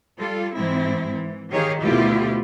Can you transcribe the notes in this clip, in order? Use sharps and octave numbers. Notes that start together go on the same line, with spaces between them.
G3 F4 A4
G#2 E3 G#3 C4 E4
E3
D#3 G4 G#4 C#5 F5
D2 B2 A3 E4 F4 G4